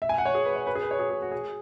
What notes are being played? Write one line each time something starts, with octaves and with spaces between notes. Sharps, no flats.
E5
G#5
F#5
C#5
G#4
B4
C#5
B4
G#4
B4
C#5
G#4
G#4
F#4
G#4